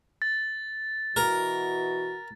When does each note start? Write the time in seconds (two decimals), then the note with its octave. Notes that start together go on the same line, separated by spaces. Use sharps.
0.22 A6
1.16 B2 E3 F#4 A#4